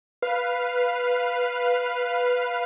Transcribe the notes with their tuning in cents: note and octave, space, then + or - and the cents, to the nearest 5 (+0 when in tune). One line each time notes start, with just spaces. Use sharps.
B4 +0 F5 +0